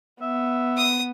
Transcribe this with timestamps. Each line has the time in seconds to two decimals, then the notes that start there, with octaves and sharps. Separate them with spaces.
0.21 B3 E5
0.77 D#6